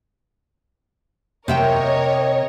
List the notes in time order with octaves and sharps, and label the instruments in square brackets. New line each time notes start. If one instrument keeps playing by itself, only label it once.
[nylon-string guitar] C3 E5 G5 [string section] A#4 C#5 D#5